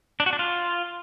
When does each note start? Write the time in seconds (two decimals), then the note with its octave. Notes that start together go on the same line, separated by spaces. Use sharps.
0.20 D4
0.26 F#4
0.33 D4
0.39 F4